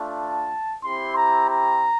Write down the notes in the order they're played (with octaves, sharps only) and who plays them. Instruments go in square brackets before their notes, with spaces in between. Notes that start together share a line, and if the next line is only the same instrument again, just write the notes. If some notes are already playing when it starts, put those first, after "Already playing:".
Already playing: [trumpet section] A3 D4 F4
A5
C4 E4 G4 C6
A#5
A#5